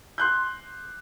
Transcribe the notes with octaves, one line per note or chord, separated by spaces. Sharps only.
C6 F#6 G6